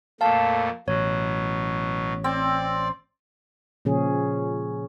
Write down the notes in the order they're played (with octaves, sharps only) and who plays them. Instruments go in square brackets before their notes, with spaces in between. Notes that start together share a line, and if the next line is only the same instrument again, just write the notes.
[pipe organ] F2 A#2 A3 [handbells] F5 A5
[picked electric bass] A1 [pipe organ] B2 F#3 [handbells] C#5
[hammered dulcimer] C4 [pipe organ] D5
[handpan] A#2 C#3 F3 C#4 G#4